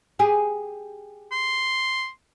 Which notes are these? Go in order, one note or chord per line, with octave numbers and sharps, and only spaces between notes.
G4 G#4
C6